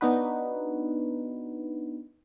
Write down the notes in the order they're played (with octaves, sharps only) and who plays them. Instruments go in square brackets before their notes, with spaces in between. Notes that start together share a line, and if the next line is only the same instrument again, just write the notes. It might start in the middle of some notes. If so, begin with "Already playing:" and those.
[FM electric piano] B3 D4 D#4 F#4 B4